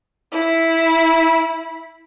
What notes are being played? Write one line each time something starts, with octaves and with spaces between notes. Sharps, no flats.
E4 B5